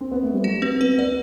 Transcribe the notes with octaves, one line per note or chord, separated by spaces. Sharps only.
C4
B3
A3
G3
F#3 F#4
B3 C4
B3 B4
B3 D5